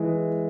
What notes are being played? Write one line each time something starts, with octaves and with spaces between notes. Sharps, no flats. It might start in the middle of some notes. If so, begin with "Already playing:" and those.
Already playing: E3 G#3